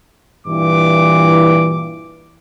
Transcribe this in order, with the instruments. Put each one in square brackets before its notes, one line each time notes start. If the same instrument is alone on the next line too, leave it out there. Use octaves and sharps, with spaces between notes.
[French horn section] G2 A#2 E3 [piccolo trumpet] D6